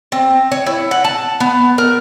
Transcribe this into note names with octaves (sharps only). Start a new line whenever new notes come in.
C4
C#5
E4
F#5
A5
B3
A#4